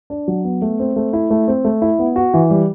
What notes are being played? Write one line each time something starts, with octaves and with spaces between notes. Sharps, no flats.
D4
F#3
B3
A3
C4
A3
E4
A3
C4
A3
E4
B3
F#4
E3
G3